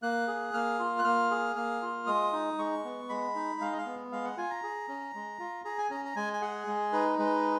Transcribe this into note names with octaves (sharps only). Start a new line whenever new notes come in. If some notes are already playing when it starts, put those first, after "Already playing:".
A#3 F#6
G#4
A#3 F6
F4
F#6
A#3 F6
G#4
A#3 F6
F4
G#3 D#6
D#4
G#3 C#6
B3
G#3 B5
D#4
G#3 F5
D#5
F5
B3
G#3 F5
F#5
F4 G#5
A#5
G#4
C#4
G#3
F4
G#4 A#5
G#5
C#4 A#5
A#5
G#3 G#5
G#5
G#4 F#5
G#3
D#4 B4
G#3 B4